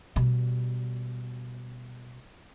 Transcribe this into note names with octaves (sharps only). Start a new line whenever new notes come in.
B2 G3